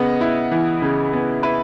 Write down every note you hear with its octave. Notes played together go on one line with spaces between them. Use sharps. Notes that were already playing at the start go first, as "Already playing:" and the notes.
Already playing: C#3 B3 D#5 F#5
E4
E3
C#3
B3
E4 B4